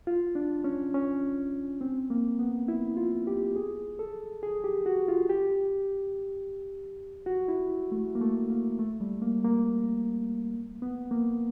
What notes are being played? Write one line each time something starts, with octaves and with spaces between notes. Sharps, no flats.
F4
D4
C#4
C#4
C4
A#3
B3
E4
F4
G4
G#4
A4
G#4
G4
F#4
F4
G4
F#4
E4
A3
A#3
A3
A#3
A3
G3
A#3
A#3
B3
A#3